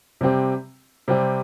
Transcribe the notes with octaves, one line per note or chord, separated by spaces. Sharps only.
C3 G3 C4 G4
C3 G3 C4 G4